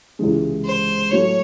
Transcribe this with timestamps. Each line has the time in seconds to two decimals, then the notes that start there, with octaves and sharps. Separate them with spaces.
0.19 C#2 C3 E3 G#3
0.65 C5
1.11 A2 F#3 A3 C#5